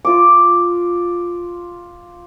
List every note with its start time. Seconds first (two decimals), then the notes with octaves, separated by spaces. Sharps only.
0.05 F4 D6